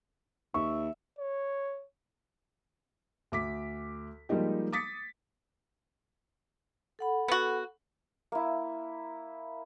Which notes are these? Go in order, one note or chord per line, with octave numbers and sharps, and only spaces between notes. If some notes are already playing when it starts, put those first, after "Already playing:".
D#2 E5 C#6
C#5
D2 D6 B6
F3 G3 G#3 A#3 D#4 G4
D6 D#6 A6 B6 C#7
A4 F#5 B5
B3 F#4
A#3 E4